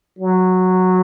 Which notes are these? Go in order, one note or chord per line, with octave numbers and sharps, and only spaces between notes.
F#3